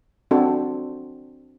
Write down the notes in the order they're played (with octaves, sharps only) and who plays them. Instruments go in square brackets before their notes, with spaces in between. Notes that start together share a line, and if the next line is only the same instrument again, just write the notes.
[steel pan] C4 D4 F#4 A4